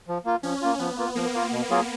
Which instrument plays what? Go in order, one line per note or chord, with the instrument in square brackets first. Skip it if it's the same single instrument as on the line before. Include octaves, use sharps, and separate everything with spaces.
[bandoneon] F3
A#3 F4
[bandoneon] F3 [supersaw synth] C#4
[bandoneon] A#3 F4
[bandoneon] F3 [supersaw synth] B3
[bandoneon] A#3 F4
[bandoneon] F3 [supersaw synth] A#3
[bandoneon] A#3 F4
B2
F#3 A#3 F4 G#4